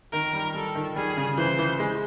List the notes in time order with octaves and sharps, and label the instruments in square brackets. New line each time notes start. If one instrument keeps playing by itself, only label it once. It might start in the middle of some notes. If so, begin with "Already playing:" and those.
[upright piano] D#3 [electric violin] A#4
[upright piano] G3
[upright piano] G3 [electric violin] A4
[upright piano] D#3
[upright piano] G3 [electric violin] G#4
[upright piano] C#3
[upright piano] E3 [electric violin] C5
[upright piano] E3
G#3